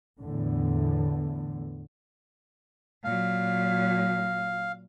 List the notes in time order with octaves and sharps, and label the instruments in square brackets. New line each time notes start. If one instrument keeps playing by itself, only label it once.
[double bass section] E2 A2 D3
[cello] A#2 F#3 [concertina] F5